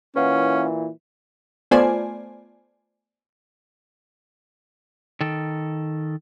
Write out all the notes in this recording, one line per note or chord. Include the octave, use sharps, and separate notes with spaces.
A#2 E3 C#4 B4 F5 F#5
A3 B3 F4 C5 D5 G#5
D#3 A4